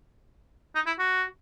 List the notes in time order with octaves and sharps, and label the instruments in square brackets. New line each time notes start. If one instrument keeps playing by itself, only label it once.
[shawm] D#4
E4
F#4